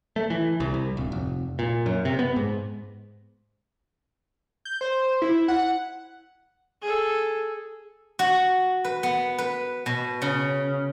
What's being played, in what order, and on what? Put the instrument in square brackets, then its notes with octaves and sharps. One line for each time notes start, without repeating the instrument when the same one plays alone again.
[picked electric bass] A3
E3
C2
C2
D1
F1
A#2
F#2
C3
B3
G#2
[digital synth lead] G6
C5
E4
F#5
[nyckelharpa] G#4 A4
[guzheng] F#4
B4
B3
B4
B2
C#3